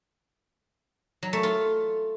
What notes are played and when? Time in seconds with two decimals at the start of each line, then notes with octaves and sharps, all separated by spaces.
1.23 F#3
1.33 A3
1.43 F4